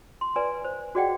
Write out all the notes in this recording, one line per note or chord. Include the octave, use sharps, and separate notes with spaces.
C6
B4 D5 G#5
C5
F#4 G#4 D5 D#5 F#5 G5